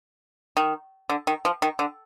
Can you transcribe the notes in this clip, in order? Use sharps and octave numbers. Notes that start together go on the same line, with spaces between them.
D#3
D3
D#3
F3
D#3
D3